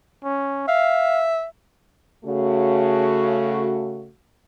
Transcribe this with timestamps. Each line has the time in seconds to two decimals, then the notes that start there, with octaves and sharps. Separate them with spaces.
0.24 C#4
0.68 E5 F5
2.25 C#3 A3 F#4